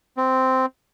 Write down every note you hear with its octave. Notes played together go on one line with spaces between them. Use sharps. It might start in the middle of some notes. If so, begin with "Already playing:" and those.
C4